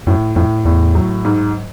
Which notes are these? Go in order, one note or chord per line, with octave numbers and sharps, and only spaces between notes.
F#2 A2
F2 A2
E2 A2
F#3
G#2